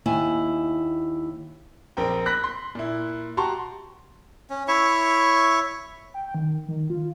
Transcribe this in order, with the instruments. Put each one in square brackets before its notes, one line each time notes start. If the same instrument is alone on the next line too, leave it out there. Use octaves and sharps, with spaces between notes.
[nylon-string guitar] D#2 E4 G#5
[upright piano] A#1 C4 A#4 G5
B5 F#6 A#6 B6
C6
A#2 E4
F#4 G4 A5 A#5 C6 C#6
[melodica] C#4
E4 C#5 E5 C#6
[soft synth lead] G5
D#3
D#3
F4